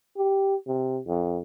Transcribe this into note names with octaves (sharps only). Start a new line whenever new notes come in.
G4
C3
F2